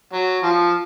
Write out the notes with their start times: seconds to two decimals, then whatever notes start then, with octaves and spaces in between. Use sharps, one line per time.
0.13 F#3
0.43 F3